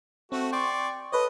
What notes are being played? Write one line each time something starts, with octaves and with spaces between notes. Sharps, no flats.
A3 C4 F#4
D5 G5 C6 C#6
A4 B4 C#5 D#5